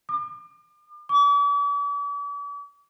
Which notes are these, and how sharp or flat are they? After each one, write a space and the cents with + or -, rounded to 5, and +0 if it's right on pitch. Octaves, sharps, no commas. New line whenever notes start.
D6 +40
D6 -45